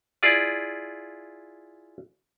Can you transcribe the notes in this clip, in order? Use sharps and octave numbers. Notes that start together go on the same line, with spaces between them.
E4 F4 G#4 D5